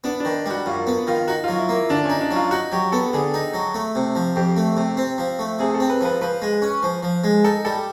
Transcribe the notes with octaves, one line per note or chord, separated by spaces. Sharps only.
B3 D4
D4
D#3
G3 F#4
F#2 F4
B3
D#3 F4
D#4 F#4
F4
F#3
E4
A#3
E4
D3 D4
C#4
D#4
D4
F#3
F4
D#4 F#4
F#3 G4
B3 A4
D3 G#4
D#4
F#3
A3
C3
F3
F2 G4
A3
C3
C4
F3
A3
C3 G#4
A4
C4
B4
F3 B4
F3 B4
G#3
C#4
F3
F3
G#3
D#4 A4
G3 A4